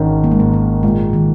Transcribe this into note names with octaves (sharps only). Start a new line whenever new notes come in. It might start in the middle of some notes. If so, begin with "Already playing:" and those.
Already playing: G#1 D#3 C#4
A#3
G#3
G#2 A#3
A#3
A#2 G#3
D#3